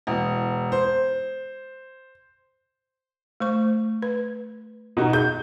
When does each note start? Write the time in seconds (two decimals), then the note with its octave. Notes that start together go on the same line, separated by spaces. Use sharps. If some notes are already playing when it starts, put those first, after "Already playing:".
0.07 E1
0.72 C5
3.40 A3 C5 C#6
4.02 B4
4.97 B2 D#4 F#4
5.13 G#4 G6